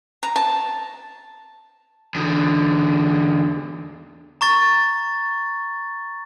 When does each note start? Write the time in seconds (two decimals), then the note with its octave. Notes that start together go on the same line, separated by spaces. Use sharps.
0.23 A#5
0.36 A5
2.15 E2 D3
4.41 A#5 C#6 A6